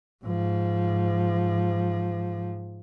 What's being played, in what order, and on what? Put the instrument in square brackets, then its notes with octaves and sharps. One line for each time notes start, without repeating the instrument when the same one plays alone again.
[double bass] G#2 F3